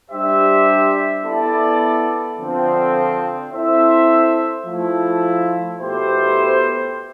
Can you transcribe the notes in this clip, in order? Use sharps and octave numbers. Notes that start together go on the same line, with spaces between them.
G3 D4 G4 C5 E5
B3 E4 A4 D5
D3 F3 C4
C4 E4 A4 C5 E5
F3 A3 E4
B2 A3 E4 G4 C5